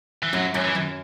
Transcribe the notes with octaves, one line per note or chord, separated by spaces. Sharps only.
E3
F#2 F#3
F#2
E3
F#2